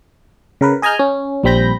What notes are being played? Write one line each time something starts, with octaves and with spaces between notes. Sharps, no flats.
C#3 A#4 B4
G#4 D#5 G#5 A#5 F6 G6
C#4
A#1 G3 C4 B5 G6 A#6